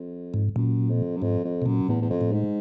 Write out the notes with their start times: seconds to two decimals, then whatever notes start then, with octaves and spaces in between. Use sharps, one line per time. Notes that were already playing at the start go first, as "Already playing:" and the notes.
Already playing: F2
0.34 G#2
0.56 F#2 A#2
0.89 F2
1.16 F#2
1.22 F2 G#2
1.44 F2
1.62 B2
1.66 F#2 A#2
1.88 E2 A2
2.01 E2
2.10 F2
2.21 A2
2.32 G#2